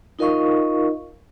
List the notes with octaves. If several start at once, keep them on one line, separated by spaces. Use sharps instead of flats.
D#4 F4 A#4 D#5 F5 C#6